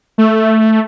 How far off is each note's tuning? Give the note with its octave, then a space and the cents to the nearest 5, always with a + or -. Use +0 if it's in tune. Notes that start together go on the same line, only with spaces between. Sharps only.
A3 +0